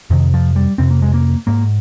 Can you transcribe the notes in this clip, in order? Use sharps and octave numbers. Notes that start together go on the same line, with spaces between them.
F2 C3 D#3
F3
G3
F2 C3 C4
A#3
G#3
A#3
G#2 A#3